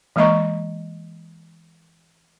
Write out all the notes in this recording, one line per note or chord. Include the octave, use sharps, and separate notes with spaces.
E3 G#3 A#3 D#5 A#5 C#6